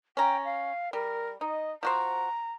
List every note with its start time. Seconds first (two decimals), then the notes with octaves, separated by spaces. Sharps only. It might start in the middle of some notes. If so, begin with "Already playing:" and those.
0.17 C#4 G5 A#5
0.45 F5
0.93 G3 A#4
1.41 D#4 D#5
1.83 F3 F#4 C5 A#5